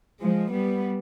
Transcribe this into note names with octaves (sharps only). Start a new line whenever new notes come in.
F3 G#3
G3 B3